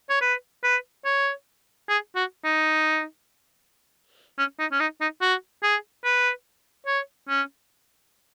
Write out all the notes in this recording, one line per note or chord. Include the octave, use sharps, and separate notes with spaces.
C#5
B4
B4
C#5
G#4
F#4
D#4
C#4
D#4
C#4
D#4
D#4
F#4
G#4
B4
C#5
C#4